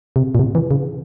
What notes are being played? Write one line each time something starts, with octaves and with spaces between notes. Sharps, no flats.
C3
A#2
C3
E3
C#3